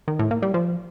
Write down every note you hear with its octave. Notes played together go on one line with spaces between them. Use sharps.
D#3
A2
A#3
G3
F3